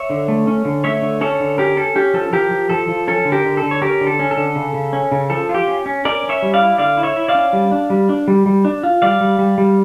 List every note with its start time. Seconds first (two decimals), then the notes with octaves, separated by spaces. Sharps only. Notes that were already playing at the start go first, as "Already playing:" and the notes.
Already playing: C#5 E5
0.10 D3
0.28 A3
0.47 C#4
0.65 D3
0.84 A3 C#5 E5
1.02 D3
1.21 C#4 A4 C#5
1.40 D3
1.58 C#4 G4 A#4
1.77 C#4 A4
1.96 C#4 G4
2.14 F3 A4
2.33 F3 G4 A#4
2.51 F3
2.70 F3 A4
2.88 F3
3.07 C#4 A4
3.25 D3
3.32 G4 A#4
3.45 D3
3.57 A4
3.62 D3
3.71 C#5
3.82 C#4 G4 A#4
4.01 D3
4.07 A4
4.19 C#4
4.31 A4
4.37 D3
4.55 C#3
4.74 C#3
4.93 C#4
5.12 C#3
5.30 F3 A4
5.49 F4
5.54 G4
5.68 C#4
5.86 C#4
6.05 C#4 A#4 D5
6.24 C#4
6.29 C#5 E5
6.42 G3
6.54 D5 F5
6.61 E4
6.78 D3 D5 F5
6.97 E4
7.03 C#5 E5
7.16 E4
7.28 D5 F5
7.35 C#4
7.53 G3
7.71 D4
7.90 G3
8.09 D4
8.28 G3
8.46 G3
8.65 D4
8.83 F4
9.02 G3 D5 F5
9.21 G3
9.39 G3
9.58 G3